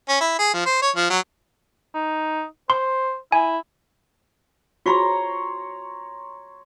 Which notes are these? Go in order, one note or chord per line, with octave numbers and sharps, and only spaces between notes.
C#4
E4
G#4
F3
C5
C#5
F3
F#3
D#4
C5 C6
E4 G#5
F4 F#4 C#5 A#5 C6 C#6